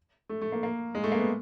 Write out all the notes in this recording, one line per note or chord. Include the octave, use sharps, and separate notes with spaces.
A3
A3
A#3
A#3
G#3
A3
A#3
B3